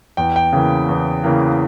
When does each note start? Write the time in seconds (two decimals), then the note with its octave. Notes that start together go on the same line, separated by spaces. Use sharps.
0.17 E2 G5
0.36 G5
0.53 C#3 E3 A#3
0.89 E2
1.24 C#3 E3 A#3